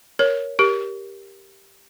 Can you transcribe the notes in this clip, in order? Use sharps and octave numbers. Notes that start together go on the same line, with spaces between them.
A#4 C#5
G4 A#4